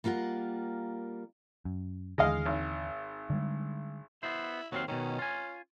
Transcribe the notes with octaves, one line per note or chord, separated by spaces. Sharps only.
G3 A#3 F4 A#4 F#5
F#2
D#2 D3 E3 G#3 D#5 F5
G#1
D3 G3 G#3
B3 E4 C5
D#2 F#3 C4 F5
B2 D#3 C#4
F4 G#5